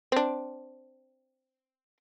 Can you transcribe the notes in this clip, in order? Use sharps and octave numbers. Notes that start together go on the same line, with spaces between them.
C4 D4